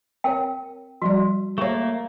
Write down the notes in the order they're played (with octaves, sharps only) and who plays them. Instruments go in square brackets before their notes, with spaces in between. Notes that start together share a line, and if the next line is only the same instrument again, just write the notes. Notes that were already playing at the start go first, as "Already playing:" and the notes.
[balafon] C4 C#5 [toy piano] A#4 G5
[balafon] F3 G3 D5 [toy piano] F#4
[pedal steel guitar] A3 A#3 [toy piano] G#4 C#5